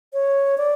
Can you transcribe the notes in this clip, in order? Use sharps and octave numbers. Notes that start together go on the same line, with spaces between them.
C#5
D5